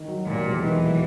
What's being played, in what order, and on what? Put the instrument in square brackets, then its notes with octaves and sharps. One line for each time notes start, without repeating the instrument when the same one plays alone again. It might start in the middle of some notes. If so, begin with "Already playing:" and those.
Already playing: [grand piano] D#3
F#3
[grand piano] D#2 [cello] A#2
[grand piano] E1
[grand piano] D#3 [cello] E3
[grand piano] F#3